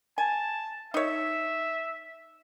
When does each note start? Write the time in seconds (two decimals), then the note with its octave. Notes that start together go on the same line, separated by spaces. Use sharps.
0.18 G#5 A5
0.94 D#4 C#5 E5